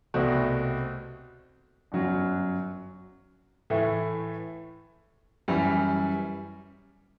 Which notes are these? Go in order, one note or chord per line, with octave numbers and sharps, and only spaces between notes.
C2 B2 A3 C4 F#4
G1 F#2 F#3
A2 E3 A3
F#2 E3 G3